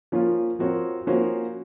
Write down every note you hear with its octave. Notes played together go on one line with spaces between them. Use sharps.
F3 A#3 C#4 F4
F3 C4 F#4 A#4 C#5
F3 A#3 C#4 F#4 C5